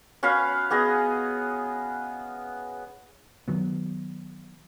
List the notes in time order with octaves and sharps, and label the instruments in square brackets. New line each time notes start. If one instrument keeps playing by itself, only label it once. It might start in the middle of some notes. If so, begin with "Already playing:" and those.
[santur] C#4 F#4 B4 F5
B3 G#4 D#5
[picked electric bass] D#3 F#3 B3